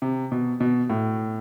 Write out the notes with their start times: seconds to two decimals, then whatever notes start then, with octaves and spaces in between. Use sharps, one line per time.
0.02 C3
0.32 B2
0.60 B2
0.90 A2